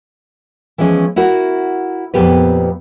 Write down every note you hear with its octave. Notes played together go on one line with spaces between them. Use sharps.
E3 F3 G#3 C#4
E4 F#4 A#4 F#5
F2 A#2 B3 G4 B4